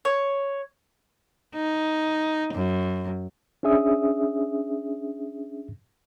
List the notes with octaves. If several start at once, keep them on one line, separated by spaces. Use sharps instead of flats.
C#5
D#4
F#2
C#4 D4 G#4 E5 D#6